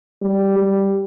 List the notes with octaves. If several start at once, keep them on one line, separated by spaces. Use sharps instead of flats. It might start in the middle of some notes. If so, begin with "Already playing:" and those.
G3
G3